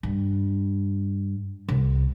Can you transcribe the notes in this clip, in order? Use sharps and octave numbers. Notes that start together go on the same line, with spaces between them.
G2
C2